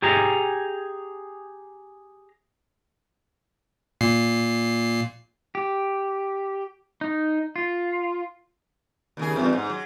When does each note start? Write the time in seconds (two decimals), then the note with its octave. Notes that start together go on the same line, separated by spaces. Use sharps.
0.02 G4 G#4 A#5
4.01 A#2 C7
5.55 G4
7.01 D#4
7.56 F4
9.17 D#2 C#3 G#4
9.36 E2 G2
9.53 G#2
9.70 F#3